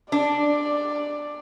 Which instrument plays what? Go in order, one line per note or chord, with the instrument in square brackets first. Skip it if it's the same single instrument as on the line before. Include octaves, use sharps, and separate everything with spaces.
[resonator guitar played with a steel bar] D4 [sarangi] D5